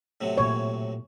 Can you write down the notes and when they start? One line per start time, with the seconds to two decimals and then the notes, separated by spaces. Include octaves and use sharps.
0.21 A2 C3 F#3
0.37 A#2 A#3 C#5